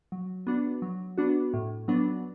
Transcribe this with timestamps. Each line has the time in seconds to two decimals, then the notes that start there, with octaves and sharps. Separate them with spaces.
0.12 F#3
0.47 B3 D4 F#4
0.82 F#3
1.18 B3 D4 F#4
1.54 A2
1.88 F#3 B3 D4